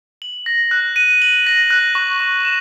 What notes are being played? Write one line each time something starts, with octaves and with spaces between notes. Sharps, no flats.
F#7
A#6
F#6
D#7
F#7
A#6
F#6
C#6
C#6
E7